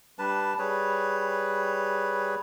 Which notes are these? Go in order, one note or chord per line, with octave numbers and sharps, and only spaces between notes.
G3 D4 B4 A5
G3 G#4 B4 C#5